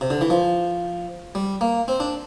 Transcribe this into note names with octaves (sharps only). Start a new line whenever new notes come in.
C3
D3
E3
F3
G3
A#3
C4
D4